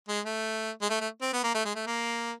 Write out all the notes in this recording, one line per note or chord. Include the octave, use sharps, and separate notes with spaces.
G#3
A3
G#3
A3
A3
C4
B3
A#3
A3
G#3
A3
A#3